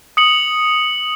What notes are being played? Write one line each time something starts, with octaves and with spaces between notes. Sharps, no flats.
D#6 C#7 F#7